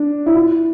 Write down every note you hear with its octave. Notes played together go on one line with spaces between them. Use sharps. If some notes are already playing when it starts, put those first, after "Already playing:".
Already playing: D4
E4
F4